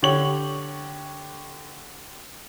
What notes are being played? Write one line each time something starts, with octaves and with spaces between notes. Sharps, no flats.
D3 G4 C#5 C#6 F#7